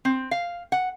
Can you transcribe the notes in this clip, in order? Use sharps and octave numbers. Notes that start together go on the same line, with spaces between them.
C4
F5
F#5